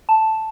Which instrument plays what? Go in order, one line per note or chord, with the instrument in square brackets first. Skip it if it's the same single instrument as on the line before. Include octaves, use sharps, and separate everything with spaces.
[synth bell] A5